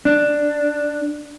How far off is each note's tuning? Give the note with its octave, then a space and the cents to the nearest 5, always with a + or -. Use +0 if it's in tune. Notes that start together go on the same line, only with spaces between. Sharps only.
D4 +5